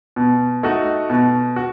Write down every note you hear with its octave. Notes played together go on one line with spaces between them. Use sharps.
B2
A3 D#4 F#4
B2
F#4